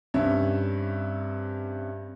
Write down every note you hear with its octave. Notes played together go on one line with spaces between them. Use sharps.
G2 C3 C#4 E5